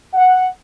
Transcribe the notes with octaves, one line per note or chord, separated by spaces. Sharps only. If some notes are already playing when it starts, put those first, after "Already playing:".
F#5